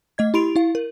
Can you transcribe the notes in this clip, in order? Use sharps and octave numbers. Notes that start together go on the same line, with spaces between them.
A3 D#5 G#6
E4 G4 B5 C6 D7 F7
E4 F5
A#4